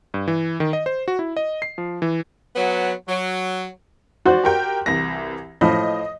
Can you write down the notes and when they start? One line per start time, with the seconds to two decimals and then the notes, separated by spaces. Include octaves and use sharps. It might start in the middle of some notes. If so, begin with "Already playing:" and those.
0.14 G2
0.28 E3
0.60 D#3
0.73 D#5
0.86 C5
1.08 F#4
1.19 E4
1.37 D#5
1.62 C7
1.78 F3
2.02 E3
2.56 F#3 B3
3.08 F#3
4.26 F#4 C5 D5
4.44 G4 A#4 G5
4.86 C2 E3 A#6
5.61 A2 F3 D#5